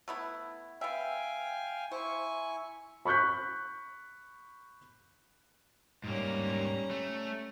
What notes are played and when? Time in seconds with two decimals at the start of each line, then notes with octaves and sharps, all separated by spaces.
0.08 A3 B3 E4
0.81 B3 E5 F5 G5 G#5
1.92 E4 C5 G#5 C#6
3.05 B5 C#6 F#6 G6 B6
6.04 G#2 G3 A#3 C#4 A#5
6.91 A3